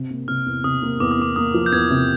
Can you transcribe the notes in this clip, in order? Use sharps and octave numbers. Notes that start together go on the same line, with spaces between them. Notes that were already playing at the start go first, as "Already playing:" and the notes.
Already playing: C3
A#3
C3 F6
E2
C3 D#6
A#3
E2 D6
D#6
A#3 D6
A#3 D#6
F3
G6
E2 G#6
C3